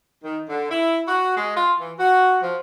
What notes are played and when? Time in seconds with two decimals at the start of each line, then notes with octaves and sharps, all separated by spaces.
0.24 D#3
0.49 D3
0.71 E4
1.08 F#4
1.36 G#3
1.56 F4
1.80 E3
1.98 F#4
2.42 F3